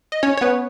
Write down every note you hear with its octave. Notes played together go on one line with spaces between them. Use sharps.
D#5
C#4 C#5
C#5
B3 B4